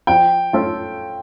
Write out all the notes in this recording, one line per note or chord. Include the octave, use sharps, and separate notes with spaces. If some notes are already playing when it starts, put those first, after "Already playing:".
F3 G5
A3 C#4 F4 A4